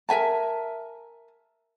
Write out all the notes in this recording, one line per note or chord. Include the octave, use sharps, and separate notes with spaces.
A#4 E5 G#5 A5